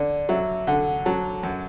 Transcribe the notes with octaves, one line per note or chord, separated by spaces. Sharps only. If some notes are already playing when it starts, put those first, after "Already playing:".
Already playing: D3 D5
F#3 E5
D3 F#5
F#3 A5
F#2